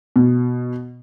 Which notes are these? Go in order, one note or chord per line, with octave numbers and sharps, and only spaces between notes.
B2